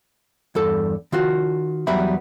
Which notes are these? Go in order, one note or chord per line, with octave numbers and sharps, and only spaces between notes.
E2 G2 A4
D#3 F4 F#4
E2 F#3 G3 B3 E5 B5